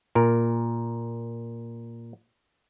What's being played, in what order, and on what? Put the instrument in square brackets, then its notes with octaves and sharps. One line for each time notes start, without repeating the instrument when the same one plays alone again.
[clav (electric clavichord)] A#2 A#4